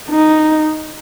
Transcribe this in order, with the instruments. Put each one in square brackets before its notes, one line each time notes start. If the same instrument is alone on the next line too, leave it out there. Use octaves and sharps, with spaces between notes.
[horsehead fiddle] D#4